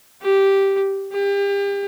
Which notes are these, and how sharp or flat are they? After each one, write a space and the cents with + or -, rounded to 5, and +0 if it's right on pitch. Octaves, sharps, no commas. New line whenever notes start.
G4 -5
G4 +35